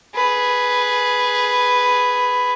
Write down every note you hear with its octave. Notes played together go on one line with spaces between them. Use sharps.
G#4 B4